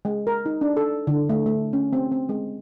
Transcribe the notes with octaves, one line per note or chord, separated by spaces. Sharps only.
G#3
A#4
D#4
D4
A4
D3
A3
A3
C#4
C4
C4
G#3